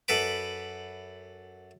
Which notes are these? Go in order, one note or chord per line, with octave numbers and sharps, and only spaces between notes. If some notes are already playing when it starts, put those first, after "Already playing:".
F#2 A4 B4 B5 D6